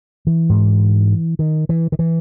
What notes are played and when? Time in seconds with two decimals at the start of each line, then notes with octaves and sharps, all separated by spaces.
0.27 E3
0.49 G#2
1.39 D#3
1.69 E3
1.92 D#3
1.99 E3